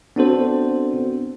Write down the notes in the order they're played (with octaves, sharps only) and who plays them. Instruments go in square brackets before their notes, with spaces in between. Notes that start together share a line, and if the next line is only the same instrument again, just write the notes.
[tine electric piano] B3 C4 D4 F#4 A4 C5